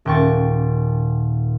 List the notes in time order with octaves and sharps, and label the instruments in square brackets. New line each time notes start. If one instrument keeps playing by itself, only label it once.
[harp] D#1 A#2 G5 C#6 A6